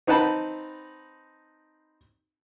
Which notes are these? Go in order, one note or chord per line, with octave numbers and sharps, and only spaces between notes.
C4 D#4 B4 F#5 A5 B5